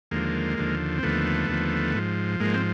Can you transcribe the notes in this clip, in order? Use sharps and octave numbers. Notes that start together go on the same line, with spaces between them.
D#2 D3 F3 G#3 A#3
D#2 D3 F3
C4
D#2 D3 F3 A3 B3
D#2 D3 F3
G#2 F3
G#2 F3 G#3 A#3
C4